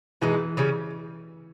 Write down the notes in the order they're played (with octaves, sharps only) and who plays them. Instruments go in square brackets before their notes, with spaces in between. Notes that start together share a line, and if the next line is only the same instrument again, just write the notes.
[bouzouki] B2 G#3 D#4 [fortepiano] E3
[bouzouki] C#3 G3 C#4